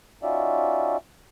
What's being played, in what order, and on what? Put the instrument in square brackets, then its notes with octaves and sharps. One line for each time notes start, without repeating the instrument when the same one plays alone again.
[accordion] C#4 D#4 F4 F#4 D5 E5